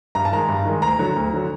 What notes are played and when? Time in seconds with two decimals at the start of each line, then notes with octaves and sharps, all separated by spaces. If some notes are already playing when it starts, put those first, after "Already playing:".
0.15 G2 A#5
0.25 A5
0.32 D#3 G#3 A#5
0.49 G2
0.65 D#3 G#3
0.82 D2 A#5
0.99 D3 F#3
1.16 D2
1.34 D3 F#3